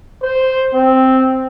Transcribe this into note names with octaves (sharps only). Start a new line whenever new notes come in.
C5
C4